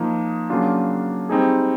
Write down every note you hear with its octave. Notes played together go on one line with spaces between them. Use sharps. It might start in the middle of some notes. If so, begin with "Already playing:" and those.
Already playing: F3 A#3 D#4
C#3 F#3 A#3 D4 F4
G3 C4 D#4 G#4